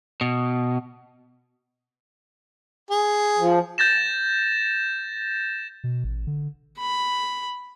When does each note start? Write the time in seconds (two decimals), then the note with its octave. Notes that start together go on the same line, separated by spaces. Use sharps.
0.21 B2
2.91 G#4
3.39 F3
3.78 G6 A6 A#6 E7
5.84 B2
6.04 A1
6.27 D3
6.79 B5